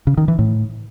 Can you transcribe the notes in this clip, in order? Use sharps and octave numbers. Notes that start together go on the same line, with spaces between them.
C#3
D#3
E3
A2